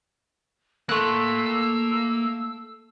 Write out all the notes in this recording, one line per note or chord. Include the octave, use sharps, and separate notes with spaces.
A3 A#3 C6 E6 F#6